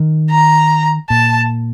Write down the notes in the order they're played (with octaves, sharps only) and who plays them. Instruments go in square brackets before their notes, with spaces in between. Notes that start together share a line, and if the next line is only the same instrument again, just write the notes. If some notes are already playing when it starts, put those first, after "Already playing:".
Already playing: [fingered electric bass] D#3
[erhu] A#5
[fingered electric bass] A#2 [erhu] A5